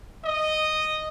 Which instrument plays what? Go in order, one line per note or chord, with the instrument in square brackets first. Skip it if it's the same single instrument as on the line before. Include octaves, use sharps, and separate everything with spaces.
[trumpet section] D#5